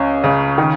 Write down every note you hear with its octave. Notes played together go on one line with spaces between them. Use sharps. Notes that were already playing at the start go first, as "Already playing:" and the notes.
Already playing: C#2 C#4
C#3
D#3